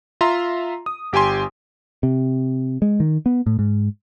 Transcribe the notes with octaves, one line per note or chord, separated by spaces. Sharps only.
F4 E5 A#5 C6
D#6
G1 G4 G5 G#5 C6
C3
G#3
D#3
B3
A2
G#2